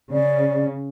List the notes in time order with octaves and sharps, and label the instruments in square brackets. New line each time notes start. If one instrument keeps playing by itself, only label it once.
[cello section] C#3 [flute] D5